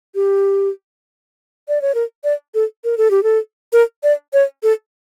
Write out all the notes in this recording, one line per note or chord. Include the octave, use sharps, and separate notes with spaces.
G4
D5
C#5
A#4
D5
A4
A#4
A4
G4
A4
A#4
D5
C#5
A4